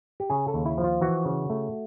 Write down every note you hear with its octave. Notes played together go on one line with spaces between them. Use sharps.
G4
C#3 G#4
A4
D#2
E4
F3
F4
E3 F#4
C#3
A3